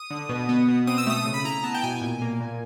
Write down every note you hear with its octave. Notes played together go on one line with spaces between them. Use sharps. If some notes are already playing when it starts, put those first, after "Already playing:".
Already playing: D#6
D3
B2
B3
B2
C4 D#6
E6
A3 D#6
C#3
B5
E4 A#5
B3 A5
G5
B2 G#5
A#2
A#3
A#2